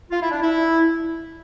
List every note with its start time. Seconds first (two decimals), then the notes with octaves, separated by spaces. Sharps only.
0.11 F4
0.21 E4
0.31 D4
0.42 E4